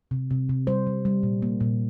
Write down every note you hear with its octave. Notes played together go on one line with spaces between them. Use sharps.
C3
C3
C3
G3 C5
G3
G3
A#2
A#3
A#2